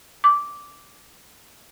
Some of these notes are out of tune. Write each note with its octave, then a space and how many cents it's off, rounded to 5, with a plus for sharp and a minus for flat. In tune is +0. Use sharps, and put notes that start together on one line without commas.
D6 -10